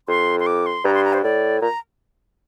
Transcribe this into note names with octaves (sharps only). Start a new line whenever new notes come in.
F2 C6
C6
D6
C6
G2 A#5
C6
A#5
C5
A2 D5
A#2 A#5